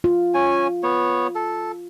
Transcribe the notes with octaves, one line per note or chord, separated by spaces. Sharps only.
F4
C#4 G#5
B3 C#5
A4